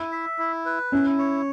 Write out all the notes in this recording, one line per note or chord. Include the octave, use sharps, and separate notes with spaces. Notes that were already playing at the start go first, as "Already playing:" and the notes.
Already playing: E4
E5
E4
B4
C#4 E4
C#5